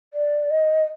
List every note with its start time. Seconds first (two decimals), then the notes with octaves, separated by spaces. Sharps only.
0.14 D5
0.50 D#5